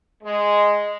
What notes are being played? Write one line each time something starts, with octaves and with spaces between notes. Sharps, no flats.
G#3